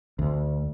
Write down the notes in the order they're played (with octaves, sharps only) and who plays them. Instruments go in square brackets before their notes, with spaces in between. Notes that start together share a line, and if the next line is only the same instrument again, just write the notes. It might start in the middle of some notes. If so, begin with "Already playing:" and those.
[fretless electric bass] D2